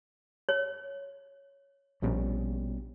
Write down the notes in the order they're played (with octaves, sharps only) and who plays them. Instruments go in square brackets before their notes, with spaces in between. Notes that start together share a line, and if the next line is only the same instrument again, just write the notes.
[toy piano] C#5
[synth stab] A#1 [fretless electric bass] B2 G3 C#4